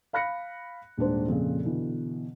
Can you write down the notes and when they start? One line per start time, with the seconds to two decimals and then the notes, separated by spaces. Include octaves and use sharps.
0.13 F5 B5 F#6 A#6 C#7
0.97 D#1 G#2 D4 C5
1.28 F2 A#2 C#3
1.64 B2 D3 E3